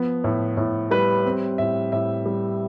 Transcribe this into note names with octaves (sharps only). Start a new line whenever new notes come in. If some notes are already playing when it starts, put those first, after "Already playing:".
Already playing: F3 B3
A2
A2
G3 B4
C4
A2 E5
A2 E5
G3